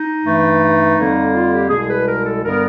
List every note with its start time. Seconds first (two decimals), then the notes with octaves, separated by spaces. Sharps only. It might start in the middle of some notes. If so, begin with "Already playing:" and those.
Already playing: D#4
0.22 G2 E3 A3
0.97 F2 D3 G3 A#3
1.33 F4
1.52 G4
1.69 C2 B2 G#3 G#4
1.88 B4
2.07 A#4
2.24 A4
2.44 G2 D3 G3 B3 A#4